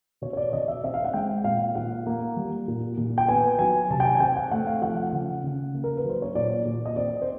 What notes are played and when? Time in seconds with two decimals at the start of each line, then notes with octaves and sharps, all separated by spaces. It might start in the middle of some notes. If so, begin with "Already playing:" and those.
0.22 B2 C#5
0.33 C#5
0.37 D5
0.52 B2 D#5
0.68 E5
0.84 C4 E5
0.94 F5
1.04 F#5
1.14 G#3 G5
1.44 A#2 F5
1.75 A#2 F#5
2.06 A#3
2.37 G3
2.68 A#2
2.97 A#2
3.18 G5
3.28 B3 G#5
3.59 F#3 G#5
3.90 C3 A5
4.00 G5
4.05 G#5
4.15 G#5
4.20 C4 G5
4.37 F#5
4.51 A3 F#5
4.67 F5
4.81 F3 F#5
4.97 F#5
5.13 C#3
5.44 C#3
5.75 A#3
5.84 A#4
5.97 B4
6.05 F#3 C5
6.22 C#5
6.35 A#2 D5
6.65 A#2
6.85 D#5
6.96 C4 D5
7.22 C5